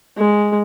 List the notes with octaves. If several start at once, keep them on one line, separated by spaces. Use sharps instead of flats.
G#3